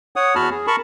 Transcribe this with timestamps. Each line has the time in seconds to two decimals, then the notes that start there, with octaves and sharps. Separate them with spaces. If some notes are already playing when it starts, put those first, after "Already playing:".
0.16 C#5 F#5 D#6
0.35 E2 F#4 A5 B5 F6
0.50 G#4
0.67 A#4 A5 B5 C#6